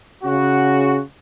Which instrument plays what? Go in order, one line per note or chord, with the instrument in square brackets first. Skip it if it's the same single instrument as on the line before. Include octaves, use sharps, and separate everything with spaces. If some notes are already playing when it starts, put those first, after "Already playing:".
[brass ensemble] C#3 F#4